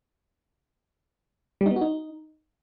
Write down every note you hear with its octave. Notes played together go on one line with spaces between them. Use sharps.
G3
D#4
B3
F#4
D#4